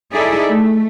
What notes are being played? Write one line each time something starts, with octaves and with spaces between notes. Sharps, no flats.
D#4 E4 G#4 A4 D5 E5
A3